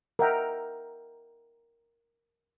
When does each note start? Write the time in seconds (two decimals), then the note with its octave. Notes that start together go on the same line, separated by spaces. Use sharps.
0.19 A#4 D#5 E5 F#5 G5 A#5